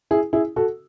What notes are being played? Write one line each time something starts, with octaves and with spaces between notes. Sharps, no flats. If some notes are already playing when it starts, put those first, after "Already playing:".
E4 G#4
E4 G#4
F#4 A4